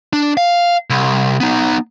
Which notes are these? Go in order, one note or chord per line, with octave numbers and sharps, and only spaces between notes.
D4
F5
C2
B3 D#4